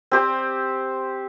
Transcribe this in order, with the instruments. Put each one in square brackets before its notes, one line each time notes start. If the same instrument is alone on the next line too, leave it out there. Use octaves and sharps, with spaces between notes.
[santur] C4 G4 C5